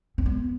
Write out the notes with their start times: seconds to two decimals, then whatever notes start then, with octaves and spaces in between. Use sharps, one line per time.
0.18 C4
0.26 B3